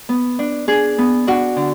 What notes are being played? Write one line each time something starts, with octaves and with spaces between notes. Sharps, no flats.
B3
D4
D4 G#4
B3
D4 F#4
D3